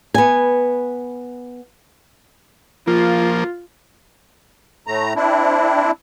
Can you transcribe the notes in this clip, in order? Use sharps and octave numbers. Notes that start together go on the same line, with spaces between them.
B3 G#5
F3 A#3 F4
A2 A3 A#5
C4 D4 E4